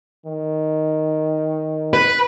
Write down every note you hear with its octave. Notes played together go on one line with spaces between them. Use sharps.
D#3
B4